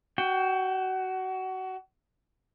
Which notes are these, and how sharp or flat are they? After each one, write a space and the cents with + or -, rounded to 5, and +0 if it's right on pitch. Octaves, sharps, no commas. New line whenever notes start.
F#4 +25 G5 +0